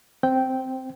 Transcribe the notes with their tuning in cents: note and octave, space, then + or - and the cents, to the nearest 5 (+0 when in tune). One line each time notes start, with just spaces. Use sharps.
C4 +0 C5 +0 G5 -5